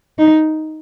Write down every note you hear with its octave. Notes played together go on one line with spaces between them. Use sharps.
D#4